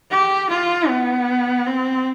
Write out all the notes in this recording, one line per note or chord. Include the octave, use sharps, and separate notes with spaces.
G4
F4
B3
C4